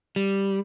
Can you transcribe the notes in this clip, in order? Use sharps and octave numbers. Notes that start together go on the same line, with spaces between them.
G3